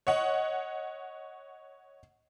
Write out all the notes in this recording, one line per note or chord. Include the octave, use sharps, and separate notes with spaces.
C#5 D#5 F#5